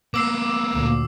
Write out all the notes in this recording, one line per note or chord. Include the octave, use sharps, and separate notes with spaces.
A#3 B3 D6 E6 C7
D2 A#2